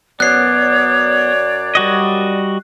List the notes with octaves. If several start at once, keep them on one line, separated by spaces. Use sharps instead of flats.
F#2 B3 C#5 D5 F#6 C7
G3 F#4 D#5